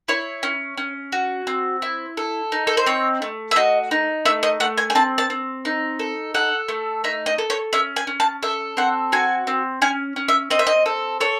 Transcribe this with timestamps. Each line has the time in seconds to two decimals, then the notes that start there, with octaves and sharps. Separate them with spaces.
0.08 E4 C#5
0.43 C#4
0.77 C#4
1.12 F#4
1.47 C4
1.82 E4
2.17 A4
2.52 D#4
2.67 A4
2.77 C5
2.86 C4 C#5
3.22 A3
3.51 E5
3.56 F#4 D#5
3.91 D#4
4.25 A3 E5
4.43 D#5
4.60 A3 F#5
4.78 G#5
4.90 G#5
4.95 C4 A5
5.18 A5
5.30 C4
5.65 D#4
5.99 A4
6.34 A4 F#5
6.68 A3
7.04 D#4 E5
7.26 D#5
7.38 A4
7.50 C#5
7.73 C#4 E5
7.96 G#5
8.07 C#4
8.20 A5
8.43 A4 E5
8.77 C4 F#5
9.12 F#4 G#5
9.47 C4
9.82 C#4 G#5
10.16 C#4
10.28 E5
10.50 C4 D#5
10.59 E5
10.67 D#5
10.86 A4
11.20 A4 C#5